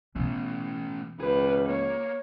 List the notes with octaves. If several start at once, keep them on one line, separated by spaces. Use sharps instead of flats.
B2 E3 A3 C#4
C#2 G#4 B4 B5
A#3 C#5